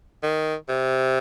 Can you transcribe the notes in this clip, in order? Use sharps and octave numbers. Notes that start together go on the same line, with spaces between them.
D#3
C3